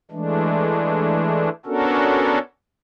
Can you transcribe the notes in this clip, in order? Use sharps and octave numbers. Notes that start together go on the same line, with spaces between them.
E3 G#3 A3 D4
B3 C#4 D4 F#4 A4 A#4